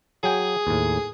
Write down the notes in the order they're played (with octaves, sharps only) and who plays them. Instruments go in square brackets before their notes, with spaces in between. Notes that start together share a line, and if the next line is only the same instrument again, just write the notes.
[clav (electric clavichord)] F#3 G5 G#5 [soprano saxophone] G#4
[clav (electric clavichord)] D#2 A2